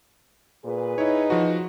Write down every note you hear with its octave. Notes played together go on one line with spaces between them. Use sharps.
A#2 G#4 B4
D#4 E4 C#5
F3 F#4